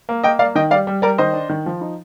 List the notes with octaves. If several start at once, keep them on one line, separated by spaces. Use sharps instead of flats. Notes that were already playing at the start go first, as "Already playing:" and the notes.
A#3
A#3 D#5 G5
A#3 D5 F5
D#3 D#5 G5
G3 D5 F5
G3
G3 A#4 D5
D#3 C5 D#5
D4
D#3
F3
D#4